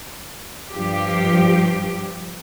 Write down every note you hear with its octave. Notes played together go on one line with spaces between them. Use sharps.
G2 F3 G4